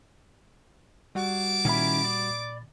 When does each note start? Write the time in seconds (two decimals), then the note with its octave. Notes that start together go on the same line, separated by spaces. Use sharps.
1.15 G3 F#4 G#4 F#5 A5 D6
1.65 A#2 D#3 C#4 E4 B5
2.04 D5